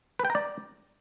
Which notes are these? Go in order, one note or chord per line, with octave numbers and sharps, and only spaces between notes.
B4
G5
A#5
D5